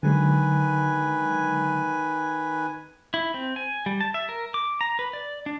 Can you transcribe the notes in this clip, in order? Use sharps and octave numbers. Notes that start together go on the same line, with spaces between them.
D3 D#3 F#3 G#3 B4 G#5
E4
C4
G#5
G3
A5
E5
A#4
D6
A#5
B4
D5
D4